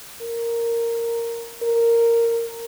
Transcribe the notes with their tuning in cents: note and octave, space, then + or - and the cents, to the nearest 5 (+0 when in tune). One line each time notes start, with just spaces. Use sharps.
A#4 -5
A#4 -10